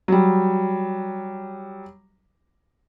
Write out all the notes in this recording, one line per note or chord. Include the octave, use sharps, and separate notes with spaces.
F#3 G3